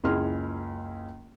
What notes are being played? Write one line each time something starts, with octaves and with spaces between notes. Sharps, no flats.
F#1 C#2 E4 G#4 C6 F6